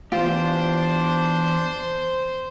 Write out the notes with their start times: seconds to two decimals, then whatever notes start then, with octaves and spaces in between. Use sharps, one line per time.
0.12 E2 G2 D4 F4 G4 C5